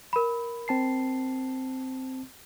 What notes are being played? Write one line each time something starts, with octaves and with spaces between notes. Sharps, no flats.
A#4 B5
C4 A5 C7